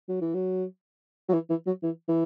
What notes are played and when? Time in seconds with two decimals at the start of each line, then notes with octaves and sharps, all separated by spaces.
0.08 F#3
0.21 E3
0.35 F#3
1.29 F#3
1.33 E3
1.50 E3
1.67 F#3
1.83 E3
2.08 E3